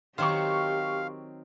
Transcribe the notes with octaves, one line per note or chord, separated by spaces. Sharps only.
D#3 F#3 C4 G4 F5 C6 C#6